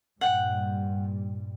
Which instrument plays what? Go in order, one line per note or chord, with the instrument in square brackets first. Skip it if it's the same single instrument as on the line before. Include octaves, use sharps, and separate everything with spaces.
[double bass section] G2 A#2 G3 [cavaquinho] F#5 G5